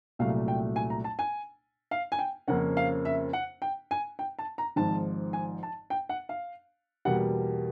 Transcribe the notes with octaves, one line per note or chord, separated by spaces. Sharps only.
C2 A#2 F#3 A3 F5
G5
G#5
A#5
A5
G#5
F5
G#5
G5
F2 C#3 F3 A#3 C#4 F#5
F5
E5
F#5
G5
G#5
G5
A5
A#5
G#1 G#2 F3 A5
G#5
A5
G5
F#5
F5
E2 B2 G3 A#3 F#5